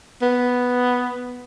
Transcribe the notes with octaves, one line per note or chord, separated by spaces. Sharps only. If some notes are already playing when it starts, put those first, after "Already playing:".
B3